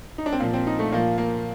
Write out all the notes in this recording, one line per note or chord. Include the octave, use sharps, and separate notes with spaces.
D#4
D4
C4
A#2 F3 A#3
C4
D#4
A3
A#2 F3 A#3
A#3